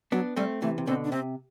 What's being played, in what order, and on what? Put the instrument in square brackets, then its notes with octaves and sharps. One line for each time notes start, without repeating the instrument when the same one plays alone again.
[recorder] F#3 [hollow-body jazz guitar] B3 D4
[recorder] G3 [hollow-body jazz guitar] A3 C4
[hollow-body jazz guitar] C3 E3 [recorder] A3
[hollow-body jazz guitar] C3
[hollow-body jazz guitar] B2 D3 [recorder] C4
[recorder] D4
[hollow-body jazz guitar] C3 [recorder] C4